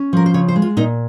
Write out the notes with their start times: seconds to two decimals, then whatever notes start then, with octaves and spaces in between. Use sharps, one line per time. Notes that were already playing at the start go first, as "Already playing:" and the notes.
Already playing: C#4
0.13 F3 A#4
0.26 C5
0.34 C#3 C#5
0.48 C5
0.56 G#3
0.62 F4
0.77 A#2 D#4